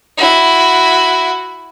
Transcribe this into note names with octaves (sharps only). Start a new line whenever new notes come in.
E4 F#4